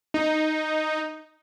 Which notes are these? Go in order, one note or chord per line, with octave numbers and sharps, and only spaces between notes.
D#4